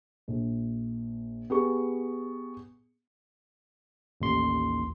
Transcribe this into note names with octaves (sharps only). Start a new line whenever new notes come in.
A#1
B3 G4 G#4 C#6
A1 D#2 C6